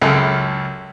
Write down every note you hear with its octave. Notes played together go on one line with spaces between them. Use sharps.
C#2 F#2 C#3 A4